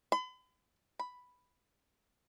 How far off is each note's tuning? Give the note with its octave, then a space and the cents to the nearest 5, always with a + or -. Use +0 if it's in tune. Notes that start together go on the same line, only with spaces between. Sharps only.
B5 +45
B5 +5